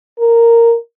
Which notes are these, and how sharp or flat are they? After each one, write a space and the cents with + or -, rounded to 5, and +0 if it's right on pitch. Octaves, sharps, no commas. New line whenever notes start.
A#4 -10